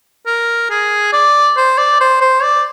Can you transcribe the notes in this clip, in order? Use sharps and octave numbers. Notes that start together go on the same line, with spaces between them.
A#4
G#4
D5
C5
D5
C5
C5
D5